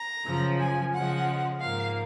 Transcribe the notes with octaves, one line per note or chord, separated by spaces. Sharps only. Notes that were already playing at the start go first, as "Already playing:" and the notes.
Already playing: A#5
F#2 C#3 F3
G#5
C#3 F3 G#3 F#5
G#2 F3 A#3 F5